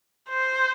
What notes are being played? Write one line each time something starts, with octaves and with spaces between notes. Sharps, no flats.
C5